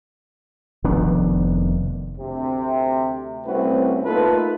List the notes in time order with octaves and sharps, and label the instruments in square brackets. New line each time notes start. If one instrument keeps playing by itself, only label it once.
[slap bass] F1 D#3 B3 D4
[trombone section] D2 C3
C2 A3 C4 C#4 F#4 B4
A3 A#3 D#4 F4 A4 B4